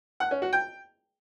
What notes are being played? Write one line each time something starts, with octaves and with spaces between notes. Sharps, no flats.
F#5
C#4
F#4
G5